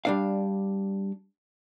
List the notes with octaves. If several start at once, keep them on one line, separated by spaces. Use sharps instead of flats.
G3 D4 F5